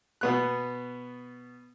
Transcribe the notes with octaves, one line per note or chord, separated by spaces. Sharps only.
B2 B3 F#6